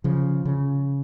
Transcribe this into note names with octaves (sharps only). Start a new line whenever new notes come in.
C#3 F3
C#3